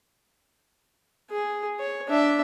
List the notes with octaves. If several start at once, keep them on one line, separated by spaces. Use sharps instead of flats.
G#4
C#5
D4 E5